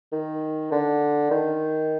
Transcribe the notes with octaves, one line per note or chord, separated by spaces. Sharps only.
D#3
D3
D#3